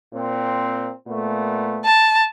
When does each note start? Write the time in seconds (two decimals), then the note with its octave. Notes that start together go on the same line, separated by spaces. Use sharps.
0.13 A#2 C4
1.07 A#2 A3 B3
1.85 A5